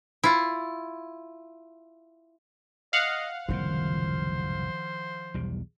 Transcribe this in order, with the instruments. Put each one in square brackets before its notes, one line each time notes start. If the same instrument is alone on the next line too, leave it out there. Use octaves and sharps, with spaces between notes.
[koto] E4 F4
[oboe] D#5 [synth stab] F5 F#5
[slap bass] F#1 C2 A2 [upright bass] D#3 F3 [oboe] C5
[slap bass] B1 E2 G3